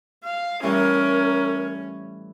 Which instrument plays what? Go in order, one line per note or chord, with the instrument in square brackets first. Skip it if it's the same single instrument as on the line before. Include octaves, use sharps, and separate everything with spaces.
[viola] F5
[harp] A2 E3 G3 [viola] C#4 [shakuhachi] A#4